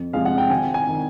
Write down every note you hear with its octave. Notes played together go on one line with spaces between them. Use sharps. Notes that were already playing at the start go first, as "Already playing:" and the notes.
Already playing: F2
C3 F3 G#3 F5
F#5
G5
G#1 G#5
G#5
D#3